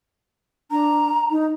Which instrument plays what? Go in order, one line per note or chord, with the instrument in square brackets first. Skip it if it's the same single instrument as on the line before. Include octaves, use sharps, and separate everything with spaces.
[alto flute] D4 [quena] A#5
[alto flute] D#4